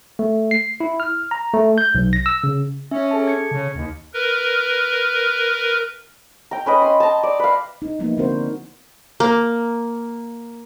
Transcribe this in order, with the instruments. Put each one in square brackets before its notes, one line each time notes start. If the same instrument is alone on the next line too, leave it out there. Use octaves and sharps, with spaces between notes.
[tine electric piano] A3
C7
E4
F6
A#5
A3
G6
B1
A#6
E6
C#3
[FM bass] C#4 [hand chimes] E5
[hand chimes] G#4 A4 A5
G#6 C#7
[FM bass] C#3
D#2
[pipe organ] A#4 B4
[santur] G5 A#5
C#4 B4 D#5
C6 D#6
A5 A#5
D5
B4 F5
[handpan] D#4
F3 G3 A#3 B3 D#4 E4
D3 C4 D4 F#4 A#4 C5
[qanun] A#3